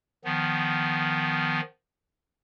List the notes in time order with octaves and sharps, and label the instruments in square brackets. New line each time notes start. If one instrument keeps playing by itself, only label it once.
[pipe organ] D#3 F3 B3